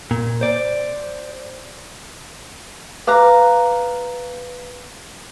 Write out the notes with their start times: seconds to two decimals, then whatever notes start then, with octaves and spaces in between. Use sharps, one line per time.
0.11 A#2
0.41 C5 D5
3.07 B4 F5 A#5 D6 F#6